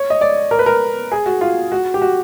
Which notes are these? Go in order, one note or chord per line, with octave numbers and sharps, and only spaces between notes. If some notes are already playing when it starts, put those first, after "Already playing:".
Already playing: C#5
D#5
D5
A#4
B4
A#4
G#4
F#4
F4
F#4
G4
F#4